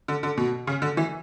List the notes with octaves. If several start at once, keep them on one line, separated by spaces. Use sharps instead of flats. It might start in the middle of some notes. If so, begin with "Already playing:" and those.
D3
D3
B2
C#3
D3
E3